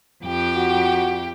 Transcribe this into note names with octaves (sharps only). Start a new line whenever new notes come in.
F2 G4 G5
F#4